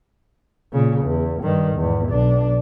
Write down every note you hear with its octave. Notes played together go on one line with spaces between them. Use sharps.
A#2 C#3
E2
G2 D#3
E2 G#2
B1 D4